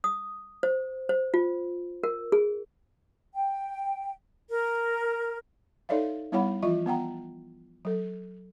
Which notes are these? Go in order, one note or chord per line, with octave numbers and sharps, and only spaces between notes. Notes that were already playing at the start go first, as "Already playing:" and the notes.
D#6
C5
C5
F4
A#4
G#4
G5
A#4
D#4 A4 C#5 D5 E5 F5
G3 B3 E4 C#5 F#5 B5
E3 F3 F4 E5 C#6
B3 F#5 G5 A#5
F#3 A4